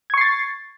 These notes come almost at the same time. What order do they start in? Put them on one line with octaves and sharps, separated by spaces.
G#6 C#6 C7 A6